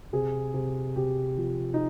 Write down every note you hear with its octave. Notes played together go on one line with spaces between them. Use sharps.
C3 G#4
C3
C3 G4
F3
D#4